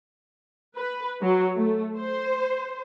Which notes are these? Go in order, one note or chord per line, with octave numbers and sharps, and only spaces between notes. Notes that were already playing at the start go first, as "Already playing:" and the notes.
B4
F#3
A3
C5